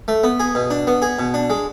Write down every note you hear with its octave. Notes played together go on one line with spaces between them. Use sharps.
A3
B3
G#4
B2
D4
B3
G#4
B2
D4
G#3